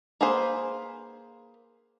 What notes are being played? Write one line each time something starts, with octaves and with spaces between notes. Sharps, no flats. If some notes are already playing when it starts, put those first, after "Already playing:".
A#3 G#4 B4 C5